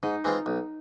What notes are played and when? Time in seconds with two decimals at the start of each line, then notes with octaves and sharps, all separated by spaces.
0.03 G#2 D#4
0.24 E3 G#3 C4 F4
0.46 B1